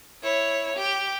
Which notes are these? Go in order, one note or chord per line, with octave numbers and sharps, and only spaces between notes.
E4 C#5
G4